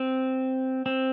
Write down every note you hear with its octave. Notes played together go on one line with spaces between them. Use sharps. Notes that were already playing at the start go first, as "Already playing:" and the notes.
Already playing: C4
C4